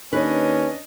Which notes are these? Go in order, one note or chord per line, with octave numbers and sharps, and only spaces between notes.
D#2 C#4 D4 B4 C#5 D#5